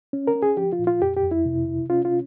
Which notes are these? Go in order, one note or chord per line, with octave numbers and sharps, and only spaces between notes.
C#4
A#4
C#4
G#4
F3 G4
F4
A#2
F4
F2 G4
G4
F2
E4
C3
C3
C#4 F4
F4